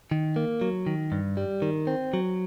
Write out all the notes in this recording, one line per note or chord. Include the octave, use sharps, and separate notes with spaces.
D#3
A#3
F#3
D#3
G2
G3
D#3
C4
F#3